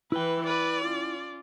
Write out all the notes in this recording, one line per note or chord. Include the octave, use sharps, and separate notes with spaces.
E3 E4 B4 G5
B4 D5
C#4 F4